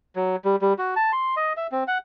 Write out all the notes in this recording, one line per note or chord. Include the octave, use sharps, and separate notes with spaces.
F#3
G3
G3
F#4
A5
C6
D#5
E5
C4
F#5